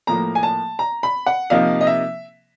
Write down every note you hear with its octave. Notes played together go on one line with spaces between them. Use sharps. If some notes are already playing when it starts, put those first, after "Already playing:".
A2 F3 A#3 A#5
G#5
A5
A#5
B5
F#5
C3 F3 A#3 D#4 F5
D#5
E5